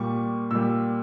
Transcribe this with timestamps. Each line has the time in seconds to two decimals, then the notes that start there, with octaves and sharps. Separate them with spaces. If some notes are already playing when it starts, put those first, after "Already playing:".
Already playing: A#2 G3 C#6
0.51 A#2 G3 E6